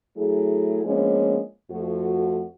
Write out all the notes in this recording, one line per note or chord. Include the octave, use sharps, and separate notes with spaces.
F#3 A3 E4 G#4
F3 G#3 A#3 B3 C#4 D4
F2 F3 A3 F#4